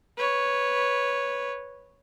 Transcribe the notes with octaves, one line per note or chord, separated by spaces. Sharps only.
B4 C#5